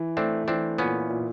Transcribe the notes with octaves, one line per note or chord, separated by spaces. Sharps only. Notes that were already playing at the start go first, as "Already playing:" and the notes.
Already playing: E3
A3 C4 D4
E3 C4 D4
A#2 B3 C#4
A#2